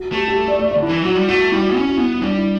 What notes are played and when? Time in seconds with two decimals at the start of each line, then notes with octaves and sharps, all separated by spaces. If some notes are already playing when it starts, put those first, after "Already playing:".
Already playing: F#4
0.12 A3 G4
0.28 G4
0.36 A4
0.48 D5
0.59 D5
0.71 D5
0.76 D3
0.82 E4
0.89 E3
1.02 F#3 F#4
1.15 G3
1.28 A3 F#4
1.52 G3 E4
1.63 F#4
1.73 C#4 E4
1.86 F#4
1.96 B3 E4
2.14 E4
2.22 G3 D4
2.37 E4